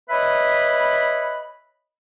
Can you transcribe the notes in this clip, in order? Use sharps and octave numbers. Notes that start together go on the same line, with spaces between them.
B4 C#5 D#5 E5 B5